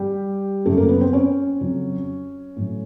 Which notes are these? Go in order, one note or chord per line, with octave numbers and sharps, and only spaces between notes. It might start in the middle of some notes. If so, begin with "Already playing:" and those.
Already playing: G3 G4
F#2 C#3 F#3 A3 A4
A#3 A#4
B3 B4
C4 C5
C#4 C#5
F2 C#3 F#3
A2 F#3